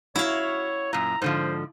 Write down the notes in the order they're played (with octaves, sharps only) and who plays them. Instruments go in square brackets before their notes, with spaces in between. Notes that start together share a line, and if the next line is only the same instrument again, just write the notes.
[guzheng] E4 F5 [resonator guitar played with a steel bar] F#4 [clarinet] C#5
[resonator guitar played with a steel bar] F#2 A#2 [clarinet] A#5
[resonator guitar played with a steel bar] G#2 D3 F3 [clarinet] C5